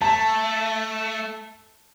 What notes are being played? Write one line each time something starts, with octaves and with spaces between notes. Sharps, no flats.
A3 A5